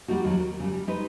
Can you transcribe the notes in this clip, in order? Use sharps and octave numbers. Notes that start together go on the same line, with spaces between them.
G3 A#3 D#4 F#4
D#2 F#3
A#4
C#3 G3
G3
G#3 D#4 B4